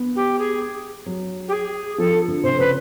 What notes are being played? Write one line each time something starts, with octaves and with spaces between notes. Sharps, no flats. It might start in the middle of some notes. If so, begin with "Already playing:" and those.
Already playing: B3
G4
G#4
F#3
G4
G#4
F3 A4
D3
C3 C5
C#3 B4